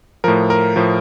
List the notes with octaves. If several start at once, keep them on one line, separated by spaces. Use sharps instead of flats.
A2 F3 A#4
A#4
A2 F3